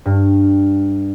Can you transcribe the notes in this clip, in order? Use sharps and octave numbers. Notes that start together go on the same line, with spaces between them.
G2